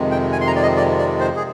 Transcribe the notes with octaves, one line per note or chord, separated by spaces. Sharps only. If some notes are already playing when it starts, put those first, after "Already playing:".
Already playing: F2 C3 D#3 G#3
G5
G#5
C6
A#5
D5
D#5
D5
D5
C5
G#4